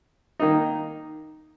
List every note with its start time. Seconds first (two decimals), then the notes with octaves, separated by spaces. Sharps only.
0.39 D#3 A#3 D#4